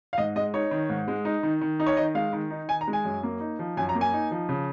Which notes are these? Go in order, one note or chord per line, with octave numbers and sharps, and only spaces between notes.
F5
G#2 D#5
G#3 D#5
D#4 C#5
D#3
G#2
G#3
D#4
D#3
D#3
D#4
C#5
D#3 D#5
G#3 F5
D#3
D#4
D#3 G#5
A#5
G#3
G#5
F#2
A#3
D#4
F3
F#2 G#5
A#5
A#3
G#5
D#4
F3
C#3